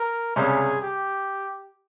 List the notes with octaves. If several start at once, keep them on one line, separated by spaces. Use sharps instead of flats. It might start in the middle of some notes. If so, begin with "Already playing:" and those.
Already playing: A#4
C#2 C3 G3 C#4 G#4
G4